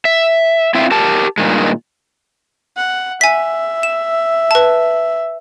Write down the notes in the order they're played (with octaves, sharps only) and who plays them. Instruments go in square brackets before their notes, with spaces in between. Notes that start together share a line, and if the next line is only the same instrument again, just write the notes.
[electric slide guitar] E5
C4 E4 F4 E5
G4 A#4 A5
G2 A#2 D#3 G#3
[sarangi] F#5
[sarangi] E5 [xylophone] G#5 B6
[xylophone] E7
B4 A5